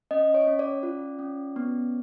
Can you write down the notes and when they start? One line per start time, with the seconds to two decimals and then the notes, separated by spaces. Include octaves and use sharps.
0.11 C#4 D#5
0.34 C#5
0.47 C#4
0.59 D5
0.83 F4
1.19 C#4
1.56 B3